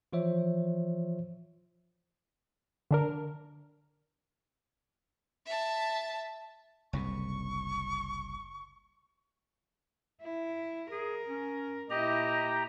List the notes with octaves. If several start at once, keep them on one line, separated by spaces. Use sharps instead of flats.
E3 F3 F4 C5 C#5 E5
D3 D4 A#4
E5 A5
F#1 C2 C3 C#6
E4
G#4 A#4
C#4
A#2 E4 G4 D#5 A#5